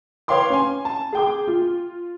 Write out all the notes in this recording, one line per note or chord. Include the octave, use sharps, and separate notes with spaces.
B4 C#5 F5 G5 C6 D6
C#4 G#5
A5
G#4 G5 D6
F4